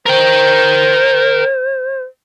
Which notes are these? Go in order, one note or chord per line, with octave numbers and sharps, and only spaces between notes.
A#4 C5 G5